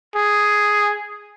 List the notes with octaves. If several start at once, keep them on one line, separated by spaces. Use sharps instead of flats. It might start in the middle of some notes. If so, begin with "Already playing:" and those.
G#4